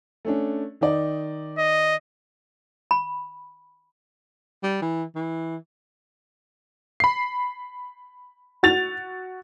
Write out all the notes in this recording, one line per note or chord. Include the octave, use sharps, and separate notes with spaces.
A3 C#4 D4
D#3 D#4 D5
D#5
B5
G3
E3
E3
B5 C7
F#4 A6 F7